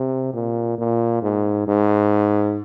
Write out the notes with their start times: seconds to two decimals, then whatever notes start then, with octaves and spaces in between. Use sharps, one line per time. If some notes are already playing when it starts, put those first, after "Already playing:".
Already playing: C3
0.33 A#2
0.78 A#2
1.23 G#2
1.67 G#2